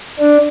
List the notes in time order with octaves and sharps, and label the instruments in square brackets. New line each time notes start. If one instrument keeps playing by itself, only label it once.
[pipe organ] D4